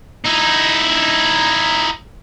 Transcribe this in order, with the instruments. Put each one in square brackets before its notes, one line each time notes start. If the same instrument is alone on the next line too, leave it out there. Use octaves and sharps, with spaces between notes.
[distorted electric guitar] D#4 E4